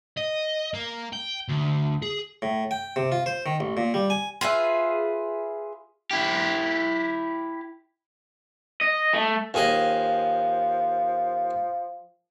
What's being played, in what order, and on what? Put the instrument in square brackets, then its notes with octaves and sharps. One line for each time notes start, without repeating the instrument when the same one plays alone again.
[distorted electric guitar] D#5
A#3
G5
D2
G#4
[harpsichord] A2
G5
C3
F4
C5
D#3
A1
A#2
G3
G#5
[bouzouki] F4 G#4 B4 E5
[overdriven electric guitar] E4 G4
D#5
A3
[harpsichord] D#2 G#4 D#5 [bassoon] F3